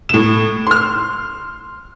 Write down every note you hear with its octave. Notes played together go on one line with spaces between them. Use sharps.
A2 E7
C6 F6